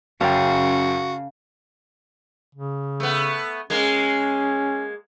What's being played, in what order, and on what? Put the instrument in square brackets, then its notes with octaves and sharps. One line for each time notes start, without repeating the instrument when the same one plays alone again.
[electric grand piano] F#2 G5 [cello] C#3 [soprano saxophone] F#4 [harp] F5 A5
[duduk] C#3
[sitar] A3 B3
[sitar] G#3 A#3 A#4 [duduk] C#4